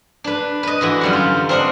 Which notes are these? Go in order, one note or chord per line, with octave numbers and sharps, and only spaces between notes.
D4 B4
B4 D#5
D3 E3 F#4
F#2 G3 F#5
F4
C4 D4 A#4 D#5 F#5